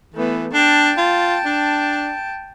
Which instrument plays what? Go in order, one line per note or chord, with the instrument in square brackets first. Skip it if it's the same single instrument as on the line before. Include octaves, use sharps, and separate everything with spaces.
[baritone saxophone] E3 [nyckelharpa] A3 B3
[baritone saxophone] D4 [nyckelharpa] G5 A5
[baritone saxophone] F4
D4